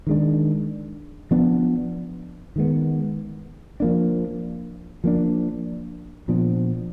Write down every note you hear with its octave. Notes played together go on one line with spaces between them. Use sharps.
D#3 G#3 D4
F3 B3 D4
D#3 G#3 B3
F3 A#3 D4
F3 A#3 D4
A#2 F3 B3 D4